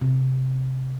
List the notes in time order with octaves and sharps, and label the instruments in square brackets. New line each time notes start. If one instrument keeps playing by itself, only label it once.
[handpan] C3